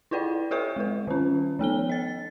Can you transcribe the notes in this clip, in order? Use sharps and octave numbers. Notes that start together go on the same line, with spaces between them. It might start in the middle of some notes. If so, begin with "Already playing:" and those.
E4 F4 B4 D5 G5
G4 A4 B4 E5 C#6
G#3 B4
D#3 C#4
F3 B3 A4 G7
D#5 A6